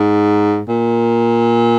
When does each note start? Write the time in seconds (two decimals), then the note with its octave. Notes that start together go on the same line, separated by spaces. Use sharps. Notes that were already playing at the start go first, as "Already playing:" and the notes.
Already playing: G#2
0.69 A#2